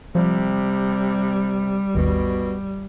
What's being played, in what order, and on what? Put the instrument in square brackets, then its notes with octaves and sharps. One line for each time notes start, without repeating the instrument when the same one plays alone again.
[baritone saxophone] C3 [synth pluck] F3 [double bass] G3
[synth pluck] G#1 D#2 [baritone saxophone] B2